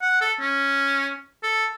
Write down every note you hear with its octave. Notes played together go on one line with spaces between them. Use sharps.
F#5
A4
C#4
A4